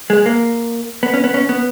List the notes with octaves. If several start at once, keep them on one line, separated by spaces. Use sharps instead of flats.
G#3
A#3
B3
C#4
B3
C#4
B3